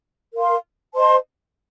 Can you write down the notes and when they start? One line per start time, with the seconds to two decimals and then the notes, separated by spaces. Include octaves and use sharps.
0.34 A#4 F5 C6
0.95 C5 D#5 A5 C6